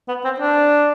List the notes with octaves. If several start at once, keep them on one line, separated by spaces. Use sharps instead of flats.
B3
C4
D4